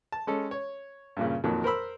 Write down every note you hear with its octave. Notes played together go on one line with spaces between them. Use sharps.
A5
G#3 C#4 A4
C#5
G2 A#2 C#3
F2 A#2 D#3 F#3
A#4 C5 B5 E6